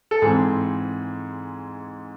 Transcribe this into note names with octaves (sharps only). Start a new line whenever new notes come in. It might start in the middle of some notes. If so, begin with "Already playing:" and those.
A4
G#2 E3 C4 G#4